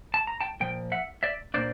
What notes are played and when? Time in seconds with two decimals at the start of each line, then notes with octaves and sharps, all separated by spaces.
0.14 A5
0.27 A#5
0.41 G5 A5
0.60 A#2 F3 G5
0.92 E5 F#5
1.23 D5 E5
1.54 A#2 G3 A#3 D4 C5 D5